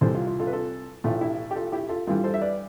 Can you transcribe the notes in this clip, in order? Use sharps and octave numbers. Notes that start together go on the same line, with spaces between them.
C2 C3 E3 G3 A4 C5
F4
F4
F4 A4
B4
F4 A4
B1 A2 E3 A3 F4
E4 G4
G4
F4 A4
E4 G4
F4 A4
G2 E3 G3 F4 A4
A4 C5
E5
B4 D5